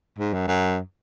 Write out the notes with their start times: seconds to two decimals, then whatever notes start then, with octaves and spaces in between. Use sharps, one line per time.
0.19 G#2
0.34 F#2
0.48 F#2